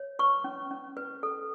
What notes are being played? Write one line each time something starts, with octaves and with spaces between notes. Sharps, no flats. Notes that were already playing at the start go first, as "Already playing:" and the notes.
Already playing: C#5
B4 C#6
C#4
C#4
B4
A4